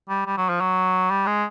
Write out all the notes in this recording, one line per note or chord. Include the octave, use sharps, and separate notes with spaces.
G3
G3
F#3
F3
F#3
G3
G#3